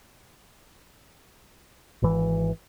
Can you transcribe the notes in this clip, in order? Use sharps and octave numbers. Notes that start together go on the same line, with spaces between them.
G#1 E3